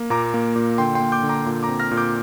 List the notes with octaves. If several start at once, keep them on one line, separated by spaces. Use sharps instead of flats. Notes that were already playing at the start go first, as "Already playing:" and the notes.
Already playing: A#3
A#2 A#5 D6
A#3
A#2
D3 G5 C6
G5 C6
A#3
D6 G6
D3
A#5 D6
A#2
A#5 D6
C4
F6 A#6
A#2
D6 G6